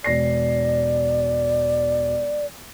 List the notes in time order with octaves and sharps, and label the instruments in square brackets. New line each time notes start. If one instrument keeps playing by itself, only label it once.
[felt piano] E1 A#6 C7 [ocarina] D5